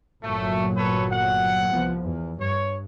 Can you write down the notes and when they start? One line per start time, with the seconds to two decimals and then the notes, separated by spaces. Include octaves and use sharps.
0.23 G1 A#2 F#3 A3
0.77 A4 B4 C#5
1.11 F#5
1.71 C2 F3 B3
2.00 E2
2.39 G2 C#5